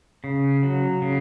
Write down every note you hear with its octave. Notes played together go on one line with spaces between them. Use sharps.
C#3
F#3
C#3